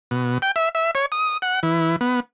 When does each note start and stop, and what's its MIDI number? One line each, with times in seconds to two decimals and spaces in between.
0.11 0.38 47
0.42 0.51 79
0.56 0.69 76
0.75 0.91 76
0.95 1.06 73
1.12 1.37 87
1.42 1.60 78
1.63 1.96 52
2.01 2.20 59